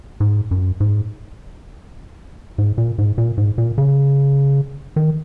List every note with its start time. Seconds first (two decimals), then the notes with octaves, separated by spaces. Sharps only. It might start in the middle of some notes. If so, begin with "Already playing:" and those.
0.20 G#2
0.51 F#2
0.80 G#2
2.58 G#2
2.78 A#2
2.98 G#2
3.18 A#2
3.38 G#2
3.58 A#2
3.78 C#3
4.96 D#3